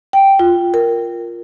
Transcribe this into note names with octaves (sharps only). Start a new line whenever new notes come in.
G5
F4
A#4